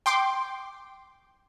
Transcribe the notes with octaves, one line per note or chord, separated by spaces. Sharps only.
G5 C6 D6